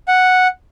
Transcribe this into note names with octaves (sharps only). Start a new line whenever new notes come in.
F#5